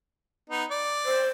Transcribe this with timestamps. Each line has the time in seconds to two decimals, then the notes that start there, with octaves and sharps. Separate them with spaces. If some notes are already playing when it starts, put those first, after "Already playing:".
0.50 B3 D#4
0.70 D5
1.05 C5